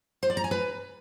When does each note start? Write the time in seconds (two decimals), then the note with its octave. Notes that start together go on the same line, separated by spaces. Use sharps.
0.23 C5
0.30 D5
0.37 A#5
0.44 G#5
0.51 B4